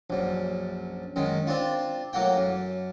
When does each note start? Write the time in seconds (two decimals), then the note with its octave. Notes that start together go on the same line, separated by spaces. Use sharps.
0.10 A#1 F#2
1.16 F#2 D#3 G#3
1.47 C4 D4 F4
2.13 A2 F#3 A#3 F#4 G5
2.37 F#2